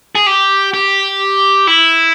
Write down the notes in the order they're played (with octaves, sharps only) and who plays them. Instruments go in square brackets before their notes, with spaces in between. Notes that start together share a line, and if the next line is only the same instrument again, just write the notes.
[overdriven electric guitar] G#4
G4
G4
E4